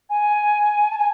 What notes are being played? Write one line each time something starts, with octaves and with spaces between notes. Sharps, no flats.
G#5
A5
G#5